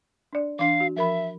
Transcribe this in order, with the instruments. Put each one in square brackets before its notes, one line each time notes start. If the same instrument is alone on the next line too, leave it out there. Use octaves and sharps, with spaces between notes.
[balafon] D4 D5
[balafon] E3 D4 [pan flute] F5
[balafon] F#4
[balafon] F3 A#4 B5 [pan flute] E5